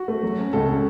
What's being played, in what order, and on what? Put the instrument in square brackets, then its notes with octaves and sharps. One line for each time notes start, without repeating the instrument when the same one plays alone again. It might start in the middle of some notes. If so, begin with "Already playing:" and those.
Already playing: [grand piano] F#4
[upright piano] A3
F#3
C#4
[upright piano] C#2 [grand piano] A4
[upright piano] C#3 [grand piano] A4